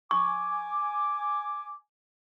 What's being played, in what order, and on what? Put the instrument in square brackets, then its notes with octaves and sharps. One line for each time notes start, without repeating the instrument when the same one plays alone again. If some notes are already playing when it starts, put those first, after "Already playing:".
[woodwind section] G#5 D6 [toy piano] C#6